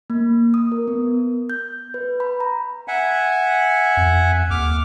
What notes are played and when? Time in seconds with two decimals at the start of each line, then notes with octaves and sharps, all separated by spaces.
0.10 A#3
0.54 D#6
0.72 A#4
0.88 B3
1.50 G6
1.94 B4
2.20 B5
2.40 A#5
2.88 E5 F#5 G#5
3.97 F2
4.50 D#2 D6 F6